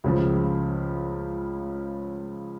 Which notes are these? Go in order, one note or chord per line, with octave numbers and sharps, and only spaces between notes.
C#2 C#3 F3